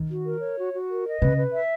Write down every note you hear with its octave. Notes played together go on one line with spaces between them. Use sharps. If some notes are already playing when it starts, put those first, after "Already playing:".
Already playing: D#3
F#4
A#4
C#5
F#4
F#4
A#4
D#5
C#3 B4
B4
E5